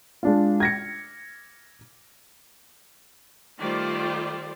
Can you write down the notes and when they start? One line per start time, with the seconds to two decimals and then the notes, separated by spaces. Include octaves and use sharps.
0.23 G#3 D4 F4
0.60 G#6 A#6 C#7
3.59 D#3 G3 A3 F4 C5 D5